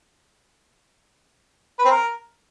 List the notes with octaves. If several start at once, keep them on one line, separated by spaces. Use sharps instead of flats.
B4
C4
A#4